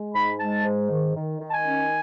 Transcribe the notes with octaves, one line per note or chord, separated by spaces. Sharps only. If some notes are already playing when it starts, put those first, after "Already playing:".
Already playing: G#3
G#2 B5
G#3 A5
G#2
D#3
D#3
D#3
A5
G#5
C#4